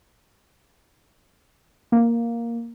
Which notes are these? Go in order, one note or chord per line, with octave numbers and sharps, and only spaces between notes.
A#3